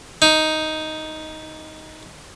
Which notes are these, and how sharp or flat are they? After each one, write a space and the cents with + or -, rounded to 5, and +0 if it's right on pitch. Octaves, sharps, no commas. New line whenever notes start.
D#4 +5